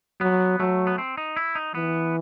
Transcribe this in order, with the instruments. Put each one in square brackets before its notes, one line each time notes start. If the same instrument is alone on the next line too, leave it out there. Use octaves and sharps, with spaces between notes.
[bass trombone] F#3 [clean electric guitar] B3
[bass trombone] F#3 [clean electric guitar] A3
[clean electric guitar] B3
C4
D#4
E4
D#4
[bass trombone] E3 [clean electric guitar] B3